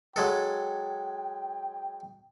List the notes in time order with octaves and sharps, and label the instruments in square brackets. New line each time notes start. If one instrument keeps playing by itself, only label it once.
[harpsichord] F#3 G#3 A4 [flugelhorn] G5